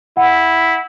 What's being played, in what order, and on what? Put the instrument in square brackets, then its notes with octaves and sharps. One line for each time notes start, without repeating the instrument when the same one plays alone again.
[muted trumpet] E4 [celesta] F#5